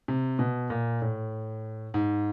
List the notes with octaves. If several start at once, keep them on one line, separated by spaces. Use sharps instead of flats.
C3
B2
A#2
A2
G#2